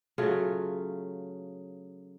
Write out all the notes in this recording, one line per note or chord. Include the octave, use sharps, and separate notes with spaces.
C#3 F#3 A3 F4